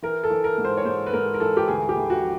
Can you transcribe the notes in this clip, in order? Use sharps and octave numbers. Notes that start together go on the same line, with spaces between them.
E3 A#4
A4
E3
A#4
G#2
C5
C#5
G#2 C5
B4
G#2 A#4
A#4
E3 A4
G4
D2 G#4
G4
D2
F#4
F3